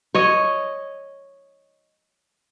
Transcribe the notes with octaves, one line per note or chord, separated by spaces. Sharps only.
C#5 D#5